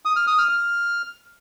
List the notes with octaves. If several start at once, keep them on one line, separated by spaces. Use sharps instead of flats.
D#6
F6
D#6
F6
F6